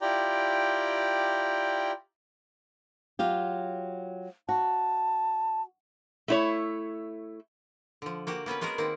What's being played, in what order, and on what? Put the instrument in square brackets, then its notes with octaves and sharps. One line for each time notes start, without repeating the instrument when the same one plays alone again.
[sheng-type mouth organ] E4 F4 G4 D5 G5 A#5
[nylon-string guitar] F#3 F4 G4
[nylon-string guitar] F#4 [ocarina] A5
[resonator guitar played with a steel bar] A3 E4 C#5
[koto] D3 F3
A#3 F#4 G4
A#3 B3 C#4 B4
G#3 B3 F#4 G#4 A#4
D#3 A#3 C4